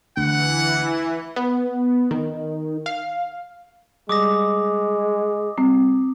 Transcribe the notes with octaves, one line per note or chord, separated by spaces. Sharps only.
D2 E3 F#5
B3
D#3
F5
G3 G#3 D6 D#6 A#6
G3 C4